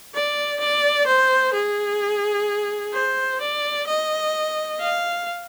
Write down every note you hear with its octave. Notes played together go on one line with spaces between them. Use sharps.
D5
D5
C5
G#4
C5
D5
D#5
F5